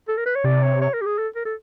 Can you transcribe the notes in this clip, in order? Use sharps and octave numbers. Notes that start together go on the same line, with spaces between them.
A4
A#4
B4
C#5
C3 D5
C#5
C#5
A#4
G4
G#4
A4
A#4
A4